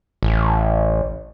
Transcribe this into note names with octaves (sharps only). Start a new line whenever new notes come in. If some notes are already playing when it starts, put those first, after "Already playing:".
A1